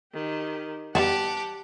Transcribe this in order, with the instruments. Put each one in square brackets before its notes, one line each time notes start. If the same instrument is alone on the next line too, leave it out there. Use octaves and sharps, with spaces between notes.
[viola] D#3 G4
[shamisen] G3 A#3 B3 [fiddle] G4 G5 [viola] F#5 [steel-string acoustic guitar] A5